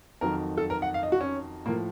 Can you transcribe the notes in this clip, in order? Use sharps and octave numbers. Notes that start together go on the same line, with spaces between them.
F2 D#3 F#3 A#4
A4
A#4
F#5
F5
D#5
F#4
C#4
A2 F3 A#3